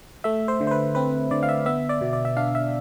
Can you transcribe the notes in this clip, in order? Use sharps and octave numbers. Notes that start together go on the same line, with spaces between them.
A3 E5
C5
D3
C5
B4
C4 B4
D3 D5
F5
E5
B3 E5
D5
B2
D5
E5
D4 F5
E5